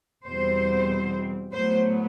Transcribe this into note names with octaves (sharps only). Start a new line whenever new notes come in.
E2 B2 G3 C4 C5
A2 F#3 B3 C5